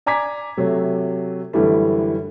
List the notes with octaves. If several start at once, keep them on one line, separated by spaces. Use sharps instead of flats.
D5 G#5 A#5 D6 G#6 B6
C3 F#3 A3
F#2 D3 E3 G3 A3